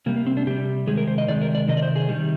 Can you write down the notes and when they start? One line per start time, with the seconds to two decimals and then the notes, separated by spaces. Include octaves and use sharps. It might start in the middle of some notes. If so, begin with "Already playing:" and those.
0.06 C3 G3 A#3
0.16 A#3
0.27 C4
0.37 D4
0.47 C3 G3 G4
0.87 C3 D#3 G#3 G#4
0.98 A#4
1.08 C5
1.18 D#5
1.28 C3 D#3 G#3 D5
1.42 A#4
1.55 D5
1.68 C3 D#3 D#5
1.77 D5
1.82 C5
1.96 G#4
2.09 C3 D#3 G3